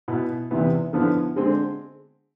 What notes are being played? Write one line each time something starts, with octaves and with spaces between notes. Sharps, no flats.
B2 B3 E4
E2 C3 E3 B3
D3 F3 B3 E4
D3 G#3 C4